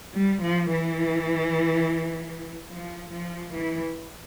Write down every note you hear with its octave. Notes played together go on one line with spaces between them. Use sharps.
G3
F3
E3
F3
F3
E3